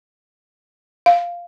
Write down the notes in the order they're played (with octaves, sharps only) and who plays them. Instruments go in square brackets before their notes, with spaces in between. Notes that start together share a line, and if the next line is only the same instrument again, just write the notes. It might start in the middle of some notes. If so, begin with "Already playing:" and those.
[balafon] F5